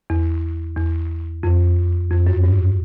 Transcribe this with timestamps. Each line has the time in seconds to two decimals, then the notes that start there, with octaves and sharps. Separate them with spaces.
0.10 E2
0.76 E2
1.43 F2
2.10 F2
2.27 F#2
2.43 G2